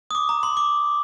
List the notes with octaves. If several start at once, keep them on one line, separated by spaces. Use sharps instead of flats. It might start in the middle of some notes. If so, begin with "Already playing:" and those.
D#6
D6
A#5
C6
D6